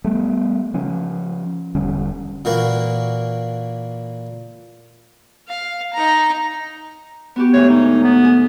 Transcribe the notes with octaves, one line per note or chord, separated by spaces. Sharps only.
G3 A3 B3
C#3 F3 C#4
E1 D3 G3 C#4
A#2 E3 A#3 F#4
F5
D#4 A#5
B3 F#4 G4
D2 G#2 G#4 C#5
D#4
B3
G#4